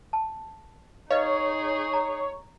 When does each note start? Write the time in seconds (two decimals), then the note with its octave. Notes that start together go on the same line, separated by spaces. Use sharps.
0.13 A5
1.11 D#4 G#4 B4 C#5 D#5 F5
1.93 A#5